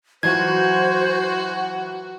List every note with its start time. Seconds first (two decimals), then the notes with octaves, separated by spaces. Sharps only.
0.23 E3 F#3 F4 F#4 C5 G#6